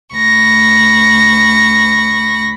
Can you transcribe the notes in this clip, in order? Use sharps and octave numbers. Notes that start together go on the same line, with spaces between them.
D2 B5 C#6 A#6